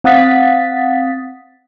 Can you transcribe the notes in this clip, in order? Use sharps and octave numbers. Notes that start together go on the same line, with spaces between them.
C4 F5 F#5 D#6 A6 B6